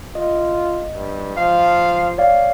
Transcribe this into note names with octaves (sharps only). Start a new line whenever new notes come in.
F4 D#5
G2
F3 F5
C#5 D5 F5